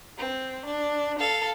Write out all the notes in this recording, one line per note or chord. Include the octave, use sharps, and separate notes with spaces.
C4
D4
A4 F5